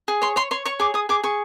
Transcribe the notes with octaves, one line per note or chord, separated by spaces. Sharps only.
G#4
C#5 C6
C#5 C6
C#5 C6
C#5 C#6
G#4 D6
G#4 D#6
G#4 D6
G#4 C#6